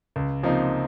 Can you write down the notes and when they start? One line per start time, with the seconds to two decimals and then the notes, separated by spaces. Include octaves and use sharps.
0.16 C#2
0.43 C3 F3 A#3 D#4